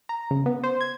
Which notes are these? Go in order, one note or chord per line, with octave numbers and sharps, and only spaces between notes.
A#5
C#3
B3
C5
G#6